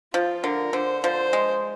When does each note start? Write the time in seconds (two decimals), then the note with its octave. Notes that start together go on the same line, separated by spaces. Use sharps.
0.14 F3 F4
0.43 D3 A#4
0.73 D3 C5
1.04 F3 C5
1.33 G#3